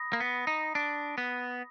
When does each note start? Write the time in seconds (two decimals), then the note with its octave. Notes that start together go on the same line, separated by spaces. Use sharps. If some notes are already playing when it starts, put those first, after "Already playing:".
Already playing: B5 D#6 A#6
0.13 A#3
0.20 B3
0.47 D#4
0.75 D4
1.18 B3